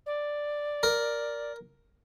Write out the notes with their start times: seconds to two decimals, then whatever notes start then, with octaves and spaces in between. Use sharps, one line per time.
0.06 D5
0.83 A#4